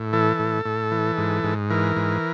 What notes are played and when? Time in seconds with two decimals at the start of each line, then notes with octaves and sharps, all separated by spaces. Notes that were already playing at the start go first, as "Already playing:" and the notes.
Already playing: A2
0.13 E3 A4
0.39 A2
0.65 A2
0.92 E3
1.18 G#2
1.44 G#2
1.70 E3 A#4
1.97 G#2